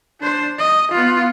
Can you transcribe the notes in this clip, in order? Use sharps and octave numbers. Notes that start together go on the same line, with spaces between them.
D4 C5
D#5
B3 F4